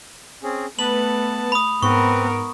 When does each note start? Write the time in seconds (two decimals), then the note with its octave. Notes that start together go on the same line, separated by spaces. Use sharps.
0.43 C4 C#4 G#4
0.79 A3 B3 B4 A5 F#7
1.52 B5 D#6
1.83 G#2 B3 C4 A#4 B4 C#6